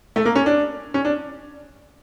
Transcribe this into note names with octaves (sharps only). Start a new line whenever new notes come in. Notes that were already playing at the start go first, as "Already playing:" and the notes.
A3
A#3
C#4
D4
C#4
D4